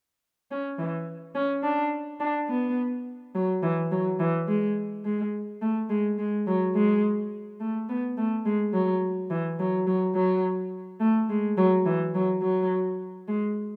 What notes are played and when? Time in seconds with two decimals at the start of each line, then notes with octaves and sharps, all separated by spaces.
0.51 C#4
0.79 E3
1.35 C#4
1.64 D4
2.21 D4
2.49 B3
3.35 F#3
3.63 E3
3.92 F#3
4.20 E3
4.49 G#3
5.06 G#3
5.62 A3
5.90 G#3
6.18 G#3
6.48 F#3
6.75 G#3
7.61 A3
7.89 B3
8.18 A3
8.46 G#3
8.74 F#3
9.31 E3
9.60 F#3
9.87 F#3
10.15 F#3
11.01 A3
11.30 G#3
11.58 F#3
11.86 E3
12.15 F#3
12.42 F#3
13.28 G#3